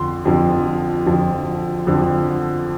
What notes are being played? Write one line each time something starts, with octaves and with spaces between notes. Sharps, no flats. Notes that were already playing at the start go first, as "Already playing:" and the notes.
Already playing: F2 D3 F3 C6
F2 D3 F3
F2 D3 F3
F2 D3 F3